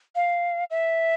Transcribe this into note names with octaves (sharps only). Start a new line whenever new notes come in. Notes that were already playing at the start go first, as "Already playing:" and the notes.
F5
E5